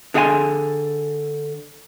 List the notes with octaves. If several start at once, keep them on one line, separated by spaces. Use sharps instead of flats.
D3 G#4 D#5 F#5 G#5 C6